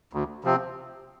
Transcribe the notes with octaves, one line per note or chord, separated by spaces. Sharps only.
D2
C3 F3 C4